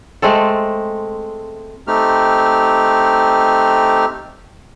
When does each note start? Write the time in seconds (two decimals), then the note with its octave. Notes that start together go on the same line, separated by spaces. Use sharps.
0.22 G#3 A3 C4 A4
1.87 A3 C4 D#4 G4 F6